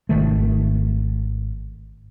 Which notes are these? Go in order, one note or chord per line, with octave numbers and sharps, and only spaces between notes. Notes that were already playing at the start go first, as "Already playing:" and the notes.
G#1 F2 D#3 A3